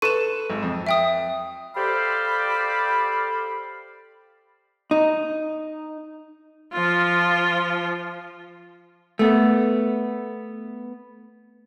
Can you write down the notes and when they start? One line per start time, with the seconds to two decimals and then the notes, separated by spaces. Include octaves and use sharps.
0.02 A4 B4 C#6 D#7 E7
0.50 G#1
0.62 F2
0.87 E5 G5 D#6
1.75 G4 A4 C5 D5 F5 B5
4.91 D#4
6.73 F3 F4
9.19 A3 B3